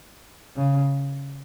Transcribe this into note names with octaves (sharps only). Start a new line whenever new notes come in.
C#3